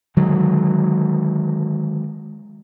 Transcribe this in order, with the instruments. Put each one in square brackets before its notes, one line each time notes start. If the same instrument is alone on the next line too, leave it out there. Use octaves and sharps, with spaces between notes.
[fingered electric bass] D3 D#3 F#3 G#3